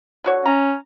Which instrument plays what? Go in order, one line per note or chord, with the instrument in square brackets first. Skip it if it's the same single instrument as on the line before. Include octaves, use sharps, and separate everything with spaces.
[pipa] D3 F#4 C#5
[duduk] C#4 [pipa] A#5